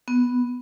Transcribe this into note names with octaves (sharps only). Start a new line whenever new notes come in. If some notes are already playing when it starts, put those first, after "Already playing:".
B3